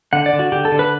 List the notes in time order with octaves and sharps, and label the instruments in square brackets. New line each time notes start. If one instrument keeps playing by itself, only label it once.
[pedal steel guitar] D3 F#5
D5
D3
F#4
D3 G4
A4
D3
B4